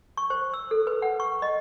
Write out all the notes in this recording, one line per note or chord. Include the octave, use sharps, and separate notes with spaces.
C#6
C5
E6
A4
B4
F#5
C#6
D#5